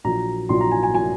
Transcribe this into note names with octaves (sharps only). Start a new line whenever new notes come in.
A#1 A#2 F#3 A#5
A#1 A#2 F#3 C6
A#5
G#5
G#5
A#2 F#3 G#5